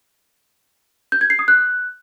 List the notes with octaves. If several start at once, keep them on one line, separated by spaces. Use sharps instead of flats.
G6
G#6
C7
D#6
F#6